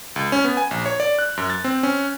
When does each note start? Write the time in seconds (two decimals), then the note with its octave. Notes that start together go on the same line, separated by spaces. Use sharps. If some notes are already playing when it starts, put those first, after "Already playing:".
0.16 C#2
0.32 C#4
0.44 B3
0.57 G#5
0.71 A#1
0.86 C#5
1.00 D5
1.19 F#6
1.37 F#2
1.50 A6
1.64 C4
1.83 C#4